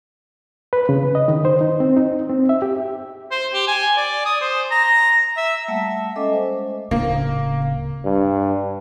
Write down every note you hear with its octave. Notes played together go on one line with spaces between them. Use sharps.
B4
C#3
D#5
D#3
C5
D#4
C4
D#4
C4
E5
G4
C5
G4
G#5
D5
D#6
C5
A#5
E5
G3 A3 A#3 E5 F#5 A5
G#3 C#4 A4 D#5 D6
C5
D1 C#3 A#3
G2